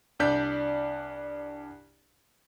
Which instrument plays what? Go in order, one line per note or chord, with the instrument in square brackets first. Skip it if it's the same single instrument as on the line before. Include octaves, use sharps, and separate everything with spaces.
[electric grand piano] C2 D4 D5 G6 B6